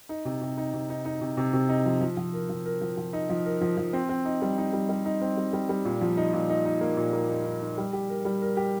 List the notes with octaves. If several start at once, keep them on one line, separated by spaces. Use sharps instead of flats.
D#4
C3
C3
D#4
C3
D#4
D#4
C3
C3
C3
D#4
F3
F3
F3
A#4
F3
A#4
F3
F3
D#4
F3
A#4
F3
F3
C4
C4
D#4
G3
D#4
G3
G3
D#4
C4
G3
G3
G3
A#2
F3
D#4
A#2
D#4
D#4
A#3
A#2
A#3
D#4
D#4
D#4
G3
G4
A#4
G3
A#4
G4